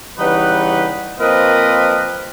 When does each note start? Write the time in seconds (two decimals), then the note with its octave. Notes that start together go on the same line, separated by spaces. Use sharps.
0.18 C#3 E3 G3 D#4 B4 F#5
1.19 F3 A#3 C4 A#4 B4 D#5